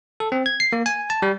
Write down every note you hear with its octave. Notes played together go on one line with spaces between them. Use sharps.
A4
C4
G#6
C7
A#3
G#5
A5
G3